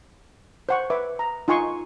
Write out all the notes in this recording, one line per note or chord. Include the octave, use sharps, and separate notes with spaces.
C5 F#5 C#6
B4 E5 D6
A#5
D#4 F4 G#5 C6 C#6